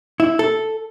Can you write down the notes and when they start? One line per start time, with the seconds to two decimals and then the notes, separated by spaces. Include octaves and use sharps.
0.20 E4
0.39 A4